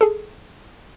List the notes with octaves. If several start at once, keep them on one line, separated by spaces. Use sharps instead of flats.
G#4 A4